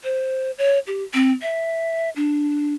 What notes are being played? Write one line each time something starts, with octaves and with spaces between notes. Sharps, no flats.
C5
C#5
G4
C4
E5
D4